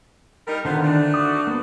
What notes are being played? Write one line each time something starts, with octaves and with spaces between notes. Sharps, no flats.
G3 D#4 A#4
D3 D#3 B3 F4 C5
A3 C4 D4
F#4 D6 D#6
A#3 B3